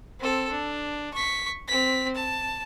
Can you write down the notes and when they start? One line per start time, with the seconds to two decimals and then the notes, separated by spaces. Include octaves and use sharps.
0.20 C4 A4
0.51 D4
1.14 C#6 B6
1.68 C4 B6
2.15 A5